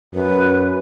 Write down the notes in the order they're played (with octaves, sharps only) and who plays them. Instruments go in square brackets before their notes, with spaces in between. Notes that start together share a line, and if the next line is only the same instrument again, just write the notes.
[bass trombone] F#2 [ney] B4